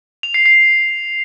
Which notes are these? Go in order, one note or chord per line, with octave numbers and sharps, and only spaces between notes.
F7
C7
C7